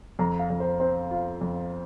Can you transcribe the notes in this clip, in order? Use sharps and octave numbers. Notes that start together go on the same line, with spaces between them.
F2 A#5
F5
F2
C5
C4 C5
F4
F2